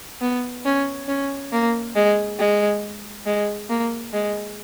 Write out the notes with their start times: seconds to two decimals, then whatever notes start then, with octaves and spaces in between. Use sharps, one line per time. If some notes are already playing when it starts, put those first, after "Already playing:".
0.21 B3
0.65 C#4
1.08 C#4
1.52 A#3
1.95 G#3
2.39 G#3
3.26 G#3
3.69 A#3
4.13 G#3